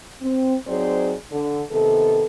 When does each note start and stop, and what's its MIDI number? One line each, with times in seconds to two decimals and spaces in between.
0.22 0.56 60
0.67 1.14 54
0.67 1.14 60
0.67 1.14 63
0.67 1.14 68
0.67 1.14 72
0.67 1.14 74
1.32 1.63 50
1.72 2.25 48
1.72 2.25 51
1.72 2.25 59
1.72 2.25 69